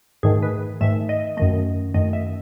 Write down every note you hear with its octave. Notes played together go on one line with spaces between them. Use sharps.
G#2 D#3 A3 G#4
B4
G#2 D#3 A3 E5
D#5
F#2 D#3 A3 D#5
F#2 D#3 A3 D#5
E5